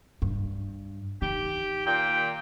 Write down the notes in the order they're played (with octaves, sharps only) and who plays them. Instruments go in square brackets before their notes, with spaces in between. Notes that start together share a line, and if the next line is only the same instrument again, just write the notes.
[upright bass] G2
[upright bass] D#3 [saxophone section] G4
[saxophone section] A#2 [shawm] G5